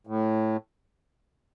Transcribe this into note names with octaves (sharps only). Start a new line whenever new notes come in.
A2